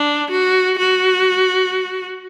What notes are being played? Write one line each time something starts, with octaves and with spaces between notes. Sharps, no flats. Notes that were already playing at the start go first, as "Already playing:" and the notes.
Already playing: D4
F#4
F#4